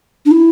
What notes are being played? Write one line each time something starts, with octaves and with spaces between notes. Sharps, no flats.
D4
E4